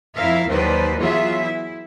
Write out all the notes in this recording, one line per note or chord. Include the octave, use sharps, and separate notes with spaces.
F2 E4 A#4 E5 F5
D#2 D#3 F#3 B4 C5 D5
E3 F#3 B3 F4 G#4 E5
E4